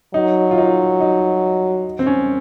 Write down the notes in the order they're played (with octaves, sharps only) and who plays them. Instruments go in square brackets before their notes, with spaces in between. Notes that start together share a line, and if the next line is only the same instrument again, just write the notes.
[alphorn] F#3 [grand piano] D#4
[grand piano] F4
D#4
D#4
C4
C#4